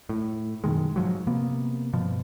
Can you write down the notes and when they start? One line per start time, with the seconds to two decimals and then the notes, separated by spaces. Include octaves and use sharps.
0.09 A2
0.64 F#2 B2 D#3 G#3
0.96 G#2 F3 F#3
1.27 C3 A#3 B3
1.93 G2 B2 F3